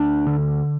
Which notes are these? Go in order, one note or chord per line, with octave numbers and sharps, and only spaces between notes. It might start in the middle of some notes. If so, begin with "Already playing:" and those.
Already playing: D2 D4
D3